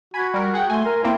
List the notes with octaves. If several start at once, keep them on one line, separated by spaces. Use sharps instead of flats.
F#4 G#5 B5 G#6
G3 A#4
G#4 F#5 G5
A3 G#5 C6
A#4
F2 A#3 C4 E4